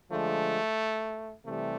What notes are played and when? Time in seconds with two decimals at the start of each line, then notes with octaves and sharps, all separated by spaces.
0.11 D3 F3 G#3 A3
1.46 C3 E3 G3 A3